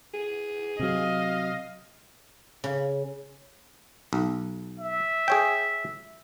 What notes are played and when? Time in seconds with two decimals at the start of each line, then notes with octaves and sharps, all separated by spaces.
0.14 G#4
0.80 C3 F#3 D#5 F5
2.64 C#3
4.13 B1
4.80 E5
5.28 G#4 C#5 G5